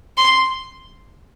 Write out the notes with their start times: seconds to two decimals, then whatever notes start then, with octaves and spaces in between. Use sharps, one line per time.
0.17 C6